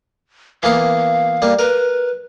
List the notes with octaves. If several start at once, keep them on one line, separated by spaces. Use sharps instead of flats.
E3 A#3 B3 F5
G3 A#3
A#4 B4